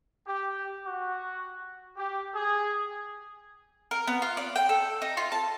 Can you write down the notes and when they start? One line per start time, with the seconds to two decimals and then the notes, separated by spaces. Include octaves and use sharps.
0.26 G4
0.86 F#4
1.96 G4
2.34 G#4
3.91 A#4
4.07 B3
4.22 F4
4.37 D5
4.56 G5
4.69 A4
5.02 D#4
5.17 F4
5.32 A5